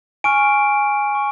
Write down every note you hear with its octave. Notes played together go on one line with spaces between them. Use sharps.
G#5 C#6 F6 D7
C#6